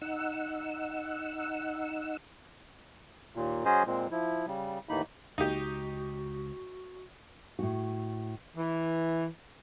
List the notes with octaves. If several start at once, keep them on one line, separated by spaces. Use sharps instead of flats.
D#4 F#5 E6
D#2 A#2
F#3 C#4 G#4 C5 D#5
A#2 G#3 C4
F3 E4
C#3 G3
D#2 A2 E3 A#3 D#4 B5
C#2 D#4 F#4 G4
A2 F#4
E3